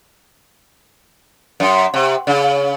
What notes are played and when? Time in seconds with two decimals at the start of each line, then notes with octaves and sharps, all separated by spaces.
1.60 F#2
1.94 C3
2.27 C#3